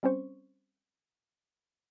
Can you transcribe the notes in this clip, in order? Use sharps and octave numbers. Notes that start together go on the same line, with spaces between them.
G3 C4 C#4 C5 C#6